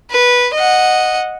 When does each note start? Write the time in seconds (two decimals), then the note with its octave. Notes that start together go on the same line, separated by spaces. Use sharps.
0.11 B4
0.54 D#5 F#5